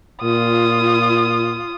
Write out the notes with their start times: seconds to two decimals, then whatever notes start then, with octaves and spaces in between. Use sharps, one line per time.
0.23 A#2 F4 D#6